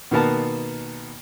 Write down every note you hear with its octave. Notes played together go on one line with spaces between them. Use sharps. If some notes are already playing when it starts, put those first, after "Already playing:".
B2 D#3 A#3 B3 A#4 A5